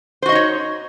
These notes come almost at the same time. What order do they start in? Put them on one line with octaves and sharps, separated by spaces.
C5 F#4 D#5 D#4 C#5